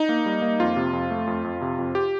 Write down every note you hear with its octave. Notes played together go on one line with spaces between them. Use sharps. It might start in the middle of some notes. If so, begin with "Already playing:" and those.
Already playing: D#4
A#3
G3
A#3
F2 F4
C3
F2
A3
F2
F2
C3
F2
G4